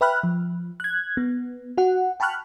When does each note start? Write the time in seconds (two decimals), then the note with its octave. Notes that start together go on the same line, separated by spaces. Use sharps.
0.01 B4 E5 G5 B5 F6 F#6
0.23 F3
0.80 F#6 G#6
1.17 B3
1.78 F#4 F#5
2.20 G5 A5 B5 C#6 F6 F#6